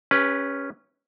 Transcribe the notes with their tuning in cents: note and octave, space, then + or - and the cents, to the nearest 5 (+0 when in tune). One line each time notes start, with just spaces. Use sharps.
C#4 +0 G4 +45 B4 -10